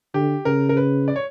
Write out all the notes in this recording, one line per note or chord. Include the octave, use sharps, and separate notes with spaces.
D3 G4
C#3 A#4
A#4
B4
D5
C#5